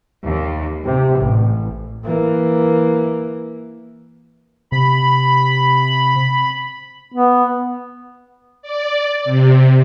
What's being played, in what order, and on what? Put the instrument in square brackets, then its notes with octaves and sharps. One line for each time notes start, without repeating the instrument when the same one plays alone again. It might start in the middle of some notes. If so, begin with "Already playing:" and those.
[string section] D#2
C3
A1
[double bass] E3 A#3
[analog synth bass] C3 [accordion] B5
[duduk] B3
[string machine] D5
C3